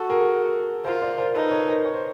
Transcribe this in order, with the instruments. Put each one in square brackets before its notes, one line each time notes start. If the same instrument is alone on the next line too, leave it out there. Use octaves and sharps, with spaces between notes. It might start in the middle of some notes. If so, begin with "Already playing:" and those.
Already playing: [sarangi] F#4 [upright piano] A4
[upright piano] G#4 A#4
[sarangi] F4 [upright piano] A#4 C5
[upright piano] C5 D5
A#4 C5
[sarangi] D#4 [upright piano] A4 B4
[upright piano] B4 C#5
A#4 C5
C#5
C5